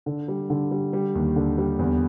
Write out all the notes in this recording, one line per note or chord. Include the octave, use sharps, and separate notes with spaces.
D3
G3
D3
G3
G3
D#2
D3
G3
E2